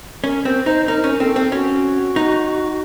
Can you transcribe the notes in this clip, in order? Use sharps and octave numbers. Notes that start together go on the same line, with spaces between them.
C#4 A#4
C4 C5
D#4 C5
D#4 A#4
C#4
C4 A4
C4
C#4 F#4
D#4